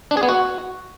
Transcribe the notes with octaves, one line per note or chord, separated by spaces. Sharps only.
D4
G#4
B3
F#4